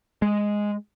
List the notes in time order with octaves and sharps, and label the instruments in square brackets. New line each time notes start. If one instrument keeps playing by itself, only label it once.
[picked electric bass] G#3